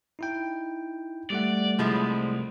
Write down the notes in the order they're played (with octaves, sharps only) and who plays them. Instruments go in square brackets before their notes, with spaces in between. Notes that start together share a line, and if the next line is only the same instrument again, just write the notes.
[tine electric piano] D#4 E4 G5
[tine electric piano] G3 A3 F#5 [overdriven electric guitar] D5
[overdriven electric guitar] C2 [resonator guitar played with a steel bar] F3 G#3 E4